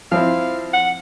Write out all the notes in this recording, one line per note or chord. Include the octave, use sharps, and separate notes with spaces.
F3 C4 E4 F5
F#5